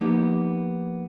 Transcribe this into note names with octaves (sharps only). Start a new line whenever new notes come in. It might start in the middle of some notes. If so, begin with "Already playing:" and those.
F3 A#3 B3 D#4 G4